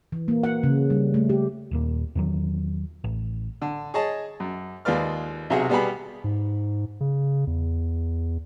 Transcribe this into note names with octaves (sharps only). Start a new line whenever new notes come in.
E3
A#3
F#5
C#3
G3
A3
G4
D#1 D#2 A#2
E2 D#3 F#3
A1
D3
G#4 C#5 D#5 A5
F#2
D#2 G#3 F4 B4 D5 F6
B1 C3 F#3 G#4 E5 F#5
B2 G3 B3 G4 G#4 B5
G#2
C#3
E2